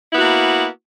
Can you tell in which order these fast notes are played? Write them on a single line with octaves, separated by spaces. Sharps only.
E4 B3 F#4 A#3